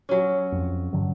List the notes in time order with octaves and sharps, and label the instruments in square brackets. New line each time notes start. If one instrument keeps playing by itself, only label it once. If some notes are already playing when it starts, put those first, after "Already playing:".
[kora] F#3 C#4
[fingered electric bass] F2
G2 D3 F#3